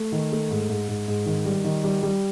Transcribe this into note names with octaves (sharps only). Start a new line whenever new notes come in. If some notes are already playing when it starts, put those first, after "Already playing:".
Already playing: A3
D#3
A3
G#2
G#2
G#2
G#2
D#3
G3
D#3
G3
G3